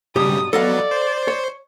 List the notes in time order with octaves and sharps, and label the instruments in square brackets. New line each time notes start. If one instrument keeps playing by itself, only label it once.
[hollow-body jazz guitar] B1 G2 G4 [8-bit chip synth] C#3 G3 [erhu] D#6
[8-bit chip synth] F#3 B3 [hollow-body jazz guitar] A4 D#5 F5 [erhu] D5
[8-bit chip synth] C5
[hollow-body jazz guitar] C#5